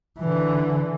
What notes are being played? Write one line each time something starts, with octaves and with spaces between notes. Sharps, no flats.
D3 E3